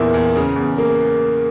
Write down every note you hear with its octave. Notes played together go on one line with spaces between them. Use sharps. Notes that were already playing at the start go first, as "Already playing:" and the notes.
Already playing: E2 A#2 A#3 E4
E2
C#3
E2
A#3